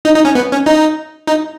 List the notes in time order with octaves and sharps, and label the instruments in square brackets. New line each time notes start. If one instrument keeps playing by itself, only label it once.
[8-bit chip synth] D#4
D#4
C#4
B3
C#4
D#4
D#4